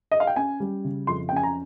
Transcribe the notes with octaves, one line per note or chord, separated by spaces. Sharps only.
D#5
F5
G5
C#4 G#5
G3
C#3
F2 C6
G5
C#4 G#5
A#5